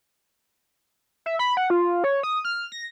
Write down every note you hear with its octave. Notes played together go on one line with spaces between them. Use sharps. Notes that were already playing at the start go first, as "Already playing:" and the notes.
E5
B5
F#5
F4
C#5
D#6
F6
A#6